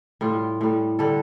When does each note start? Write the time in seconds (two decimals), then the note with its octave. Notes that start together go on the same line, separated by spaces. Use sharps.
0.21 A2 G3 F4
0.61 A2 G3
0.99 D3 G3 A4